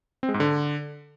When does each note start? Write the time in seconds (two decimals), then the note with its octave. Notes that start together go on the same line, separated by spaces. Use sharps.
0.23 C4
0.29 G#3
0.34 G#2
0.40 D3